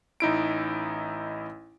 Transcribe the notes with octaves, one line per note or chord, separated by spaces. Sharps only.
A1 D#4 E4 D7